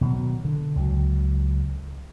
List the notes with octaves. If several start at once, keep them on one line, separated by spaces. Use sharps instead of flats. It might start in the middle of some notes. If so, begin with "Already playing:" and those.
B2 D#3 F3 F#3
D3
C#2 F#3